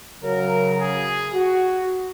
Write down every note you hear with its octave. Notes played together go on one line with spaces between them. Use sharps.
C#3 F#3 A#4
G#4
F#4